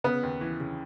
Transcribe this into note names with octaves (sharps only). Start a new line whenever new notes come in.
C#3 B3
D#2
E3
C#3